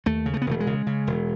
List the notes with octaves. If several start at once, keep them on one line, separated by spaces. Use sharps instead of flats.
D#2 A3
C#3
A3
B3
E1 A3
G#3
C#3
C#3
E1